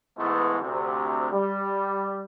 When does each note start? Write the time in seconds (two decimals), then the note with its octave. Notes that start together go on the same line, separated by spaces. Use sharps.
0.18 G#2 E3 G#3 A3 B3
0.60 D2 C3
1.32 G3